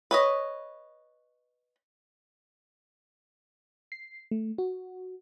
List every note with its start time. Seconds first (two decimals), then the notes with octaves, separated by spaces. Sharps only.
0.11 B4 C#5 D#5
3.92 C7
4.31 A3
4.58 F#4